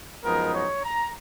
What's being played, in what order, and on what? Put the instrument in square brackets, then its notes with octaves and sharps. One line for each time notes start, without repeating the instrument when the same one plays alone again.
[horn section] F#2 F3 G#3 B3 D#4 A#4
C#5
A#5